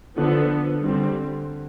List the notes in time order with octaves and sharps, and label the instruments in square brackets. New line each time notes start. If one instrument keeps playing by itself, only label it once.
[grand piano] D3 [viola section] F3 B3 D4 A4
[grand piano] D3 [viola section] G3 C4 G4